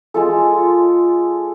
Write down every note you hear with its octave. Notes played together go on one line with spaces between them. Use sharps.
G#3 F4 A4